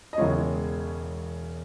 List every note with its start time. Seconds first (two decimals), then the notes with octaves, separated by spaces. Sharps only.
0.13 D#5
0.18 E1 E2 C#3 G#3 C#5